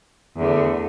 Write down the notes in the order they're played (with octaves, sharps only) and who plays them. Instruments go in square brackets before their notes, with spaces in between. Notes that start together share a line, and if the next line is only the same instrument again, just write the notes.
[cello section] E2 D3 A3